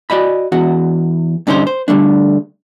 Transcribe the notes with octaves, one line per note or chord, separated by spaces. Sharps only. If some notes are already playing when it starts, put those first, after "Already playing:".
F#4 D5 D#5 B5
E2 F#4 F#5
G2 D3 C#4 D#4 A#4 C5
C5
D3 G3 A3 D4